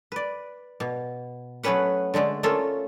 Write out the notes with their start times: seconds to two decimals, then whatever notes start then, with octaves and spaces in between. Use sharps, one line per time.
0.12 B4 D5
0.80 B2
1.63 F#3 A3 B3 C#4 B4 F#5
2.14 D3 G#3 A3 D4
2.43 A3 A#3 C#4 F4 A4